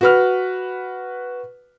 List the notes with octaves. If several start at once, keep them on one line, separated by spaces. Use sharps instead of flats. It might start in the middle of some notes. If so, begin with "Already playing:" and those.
F#4 B4 F6